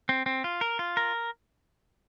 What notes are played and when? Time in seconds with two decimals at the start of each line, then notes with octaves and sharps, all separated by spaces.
0.09 C4
0.26 C4
0.44 F4
0.61 A#4
0.79 F4
0.97 A#4